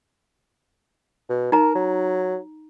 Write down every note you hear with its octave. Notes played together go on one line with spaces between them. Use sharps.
B2
D#4 A#4 A#5
F#3